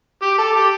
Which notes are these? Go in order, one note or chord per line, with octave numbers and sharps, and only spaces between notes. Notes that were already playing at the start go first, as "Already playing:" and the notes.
G4
A4
G4